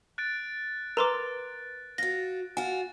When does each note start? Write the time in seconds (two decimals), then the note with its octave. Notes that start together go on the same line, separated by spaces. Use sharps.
0.18 F#6 A6 D7
0.97 A#4 B4 A#5 C6 D6
1.98 F4 F#4 A#6
2.57 F4 F#4 G#5